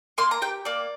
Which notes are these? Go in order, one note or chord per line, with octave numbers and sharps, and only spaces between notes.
A#3 C6
A#5
G4 G5
A#3 D5